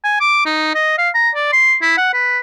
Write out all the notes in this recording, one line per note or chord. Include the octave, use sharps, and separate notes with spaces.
G#5
D6
D#4
D#5
F5
A#5
D5
C6
E4
F#5
B4